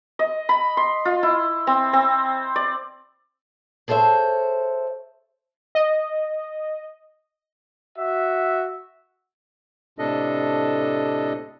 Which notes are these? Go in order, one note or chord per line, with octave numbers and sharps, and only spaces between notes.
D#5
B5
C6
F4
E4
C4
C4
D5
G#4 A4 C5 C#5 E5
D#5
F#4 E5
A2 C3 D4 A4 D#5